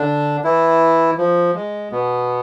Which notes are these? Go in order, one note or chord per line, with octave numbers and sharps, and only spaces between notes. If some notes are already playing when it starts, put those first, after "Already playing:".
Already playing: D3 D4
E3 E4
F3
G#3
B2 B3